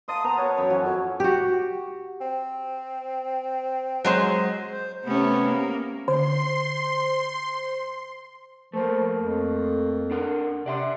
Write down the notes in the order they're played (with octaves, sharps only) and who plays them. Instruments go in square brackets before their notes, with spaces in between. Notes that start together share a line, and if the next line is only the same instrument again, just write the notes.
[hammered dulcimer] A#4 A5 [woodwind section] F5 C6 D#6
[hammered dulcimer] B3 [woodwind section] C5 A#5
[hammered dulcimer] A#4 B4 A5 [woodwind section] C#5
[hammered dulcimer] F#2 B4 G5
F3 F#3 C#4
[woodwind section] F2
[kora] F#4 G4
[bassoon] C4
[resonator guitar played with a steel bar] F#3 G#3 C5 [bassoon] C#4
[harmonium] C5
[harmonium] C3 B3 [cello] A3 C#4
[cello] A#3
[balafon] D3 [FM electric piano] C5 [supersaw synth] C6
[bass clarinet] F3 [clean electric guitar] A3 A#3
[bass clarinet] F2
[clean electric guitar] D4 A#4 F#5
[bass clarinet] C3 [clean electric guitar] D5 F#5 C6